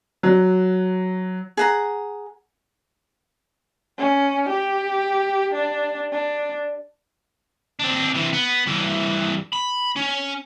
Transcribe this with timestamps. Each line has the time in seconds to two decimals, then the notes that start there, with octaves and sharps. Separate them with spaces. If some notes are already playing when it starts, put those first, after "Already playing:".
0.23 F#3
1.57 G#4 F#5 A#5
3.98 C#4
4.50 G4
5.55 D4
6.12 D4
7.79 C4 D4
8.15 C3 E3
8.33 B3
8.67 G2 E3
9.53 B5
9.97 C#4